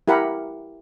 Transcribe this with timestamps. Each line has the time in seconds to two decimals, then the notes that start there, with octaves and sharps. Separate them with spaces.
0.08 E4 G4 A#4 F#5 B5